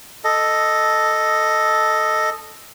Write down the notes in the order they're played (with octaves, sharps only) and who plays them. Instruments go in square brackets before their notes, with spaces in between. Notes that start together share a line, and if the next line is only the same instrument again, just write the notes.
[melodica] A4 D#5